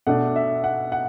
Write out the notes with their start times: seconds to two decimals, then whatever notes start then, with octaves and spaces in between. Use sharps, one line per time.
0.07 B2 A3 D4 F#5
0.36 E5
0.64 F#5
0.92 F#5